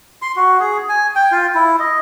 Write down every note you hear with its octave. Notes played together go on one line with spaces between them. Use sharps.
C6
F#4
G#4
G#5
G5
F4
E4
D#5